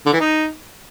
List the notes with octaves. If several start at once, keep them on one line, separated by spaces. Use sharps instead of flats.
D3
E3
D#4